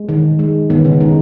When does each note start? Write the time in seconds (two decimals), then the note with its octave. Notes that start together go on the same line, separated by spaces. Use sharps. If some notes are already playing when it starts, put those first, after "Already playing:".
Already playing: G#3
0.09 D#3
0.39 G#3
0.70 D#3 B3
0.85 C#3 C#4
1.00 D#3 G#3 D#4